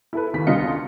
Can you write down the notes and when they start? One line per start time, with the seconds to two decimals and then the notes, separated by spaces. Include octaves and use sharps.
0.13 E4 A4 B4
0.33 D#2 B6
0.47 C2 D3 C#4 F4 D#5 C#7